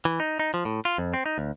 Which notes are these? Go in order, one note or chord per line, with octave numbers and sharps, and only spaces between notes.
E3
D#4
D#4
F3
A2
F4
F2
C4
D#4
D2